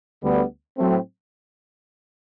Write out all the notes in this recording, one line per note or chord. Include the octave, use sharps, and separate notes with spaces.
D2 D3 G3 B3
A2 F#3 A3 C4